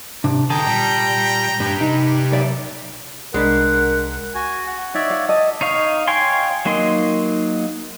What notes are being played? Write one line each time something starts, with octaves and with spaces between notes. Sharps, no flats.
G#2 C3 D4
B2 D3 G#4 G5 A5 A#5
A#2 G3
G2 G4 B4
C3 D#4
B1 D5 E5
C2 G#3 D4 A#4 F#5 B5 B6
F#4 G#5
F#5
D#4 C#5 D5 E5
F5
D#5 A5
D#4 C#5 F5
C#5 F5 G5 G#5 C6
F#3 A#3 D#4 C6